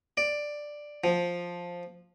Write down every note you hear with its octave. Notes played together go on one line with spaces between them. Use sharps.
D5
F3